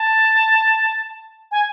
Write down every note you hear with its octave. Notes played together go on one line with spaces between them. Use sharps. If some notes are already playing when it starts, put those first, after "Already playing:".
Already playing: A5
G#5